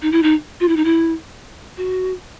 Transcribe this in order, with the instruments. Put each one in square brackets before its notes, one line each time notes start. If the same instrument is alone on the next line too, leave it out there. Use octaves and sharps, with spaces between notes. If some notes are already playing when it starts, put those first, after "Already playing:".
[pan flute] D#4
E4
D#4
F4
E4
D#4
E4
F#4